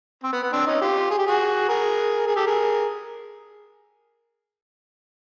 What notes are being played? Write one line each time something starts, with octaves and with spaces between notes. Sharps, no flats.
C4
B3
B3
C4 D4
C#4 D#4
F4 G4
G#4
G4
F#4 G#4
G#4 A#4
G#4 A#4
G4 A4
G#4 A#4